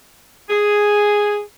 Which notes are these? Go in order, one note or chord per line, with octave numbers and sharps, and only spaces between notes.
G#4